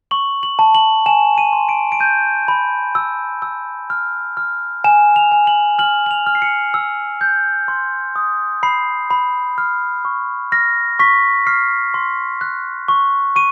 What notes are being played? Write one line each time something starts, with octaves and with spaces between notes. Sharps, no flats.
C#6 F#7
F#7
A5
F#7
G#5 E7
D#7
C6
D7
D7
G6 D#7
B5
E6
E6
F6
F6
G#5 E7
F7
G#5
F#7
F6 F#7
F#7
F7
F6
C7
C#7
E6
G6
C6
D#6
B5 C7
B5
F6
C#6
F6 A#6
C#6 B6
F6 C7
C6
F#6
C#6
C#6 D#7